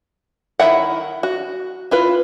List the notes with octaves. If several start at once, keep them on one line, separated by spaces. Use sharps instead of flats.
D#3 F#3 E4 E5 F#5
F#4
E4 F4 B4